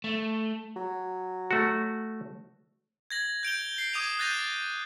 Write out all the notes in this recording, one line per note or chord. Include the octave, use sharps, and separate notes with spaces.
A3
F#3
A3 F#4
G#6 A#6 F#7
G6 D7 F7 G7
C7
D6 D#6 G#6 D#7 F7
F#6 G6 A6 A#6 D#7 F7